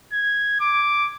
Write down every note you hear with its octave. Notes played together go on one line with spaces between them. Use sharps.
G#6
D6